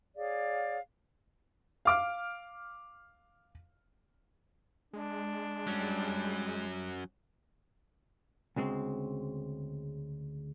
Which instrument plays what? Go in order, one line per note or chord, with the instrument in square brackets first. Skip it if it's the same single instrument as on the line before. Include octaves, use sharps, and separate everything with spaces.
[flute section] G#4 C#5 D5 F5
[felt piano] F5 D6 F6
[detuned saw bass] G#3 [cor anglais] D4
[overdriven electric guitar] F#3 C#4 [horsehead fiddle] G3
[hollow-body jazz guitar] D2 C#3 G#3 C4